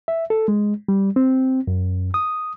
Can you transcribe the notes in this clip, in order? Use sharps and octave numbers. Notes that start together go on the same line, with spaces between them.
E5
A4
G#3
G3
C4
F#2
D#6